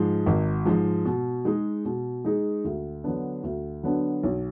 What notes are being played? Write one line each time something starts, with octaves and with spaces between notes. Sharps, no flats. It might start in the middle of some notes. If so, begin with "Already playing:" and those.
Already playing: G#2 F3 G#3
G#1
G#2 F3 G#3
B2
G#3 D#4 G#4
B2
G#3 D#4 G#4
D2
D3 F#3 B3 D4
D2
D3 F#3 B3 D4
B1